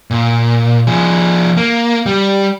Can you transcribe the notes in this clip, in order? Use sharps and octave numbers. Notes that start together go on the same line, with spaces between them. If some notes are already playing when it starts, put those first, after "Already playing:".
A#2
F3 G#4
A#3
G3